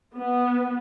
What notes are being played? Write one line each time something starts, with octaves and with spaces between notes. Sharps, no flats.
B3